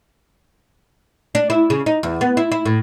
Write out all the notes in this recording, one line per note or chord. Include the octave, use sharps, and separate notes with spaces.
D4
E4
C#3
D#4
E2
B3
E4
E4
A2